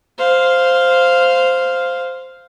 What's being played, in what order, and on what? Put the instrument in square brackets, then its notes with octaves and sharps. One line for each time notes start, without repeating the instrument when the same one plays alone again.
[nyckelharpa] C5 F5